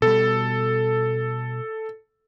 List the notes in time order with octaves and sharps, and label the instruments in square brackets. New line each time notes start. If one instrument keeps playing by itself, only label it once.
[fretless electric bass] B2 G3 [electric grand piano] A4